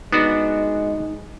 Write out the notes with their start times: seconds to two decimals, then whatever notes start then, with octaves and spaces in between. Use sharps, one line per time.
0.12 G#3 B3 D4 D#4 F#4